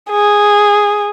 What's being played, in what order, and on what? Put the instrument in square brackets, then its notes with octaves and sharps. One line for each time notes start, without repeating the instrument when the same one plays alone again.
[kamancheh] G#4